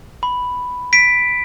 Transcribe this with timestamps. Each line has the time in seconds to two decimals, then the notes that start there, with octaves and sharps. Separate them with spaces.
0.23 B5
0.93 B6 D7